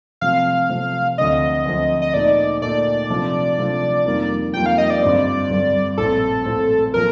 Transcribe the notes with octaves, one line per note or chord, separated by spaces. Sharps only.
C3 F3 A3 C4 F5
C3 F3 A3 C4
D2 D3 F3 C4 D#5
D2 D3 F3 C4
D#5
A#2 A3 D#4 D5
A#2 A3 D#4 D5
C3 F3 A3 D4 F4
C3 F3 A3 D4 F4
F2 D#3 G3 A#3 F4
F2 D#3 G3 A#3 F4 G5
F5
D#5
D5
G2 D3 G3 C4
G2 D3 G3 C4
A#1 A2 A3 C4 A4
A#1 A2 A3 C4
A#2 F3 A#4